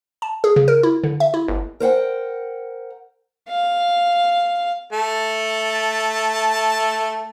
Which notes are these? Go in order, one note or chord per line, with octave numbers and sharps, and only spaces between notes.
A5
G#4
C#3
A#4
E4
D3
E5
E4
G1
A#4 C5 F#5 G5
F5
A3 A5